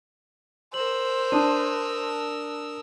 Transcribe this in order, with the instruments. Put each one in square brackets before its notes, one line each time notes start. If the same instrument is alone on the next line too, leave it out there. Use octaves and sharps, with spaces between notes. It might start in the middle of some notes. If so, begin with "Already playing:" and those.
[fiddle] A#4 E6 [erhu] C5 [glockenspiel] F#7
[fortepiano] D4 [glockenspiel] A5 D#6 D#7